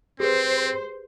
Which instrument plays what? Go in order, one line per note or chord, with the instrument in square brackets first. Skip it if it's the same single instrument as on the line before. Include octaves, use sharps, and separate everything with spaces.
[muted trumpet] C4 [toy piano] G4 G#4 B4 [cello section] C5